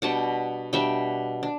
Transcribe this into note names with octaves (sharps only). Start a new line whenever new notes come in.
B2 G3 D4 F#5 A5
B2 G3 D4 E5 G5
D4